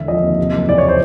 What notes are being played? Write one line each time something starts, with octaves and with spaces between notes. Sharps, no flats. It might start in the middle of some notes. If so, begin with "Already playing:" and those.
Already playing: E1 D3 E5
F3 D#5
D#2
C3
F#1
E3 D5
C#5
C5